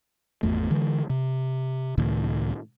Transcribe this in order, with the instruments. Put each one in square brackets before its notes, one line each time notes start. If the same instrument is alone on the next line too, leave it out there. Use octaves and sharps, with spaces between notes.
[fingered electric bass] G#1 E2 A3
D3 E3 G#3
C3
C#2 A2 D#3